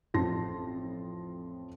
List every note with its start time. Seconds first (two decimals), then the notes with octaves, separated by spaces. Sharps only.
0.14 A1 F2 F4 A5 C6 A#6